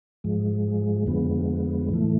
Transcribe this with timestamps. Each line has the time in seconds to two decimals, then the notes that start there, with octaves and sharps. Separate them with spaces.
0.24 G#2 F3 G#3
1.07 F2 D3 F3 G#3 B3
1.89 A2 E3 A3